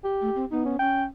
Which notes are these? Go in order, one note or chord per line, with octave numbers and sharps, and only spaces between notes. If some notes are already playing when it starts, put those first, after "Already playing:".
G4
A3
C4
B3 D#4
C#4
C#4 G5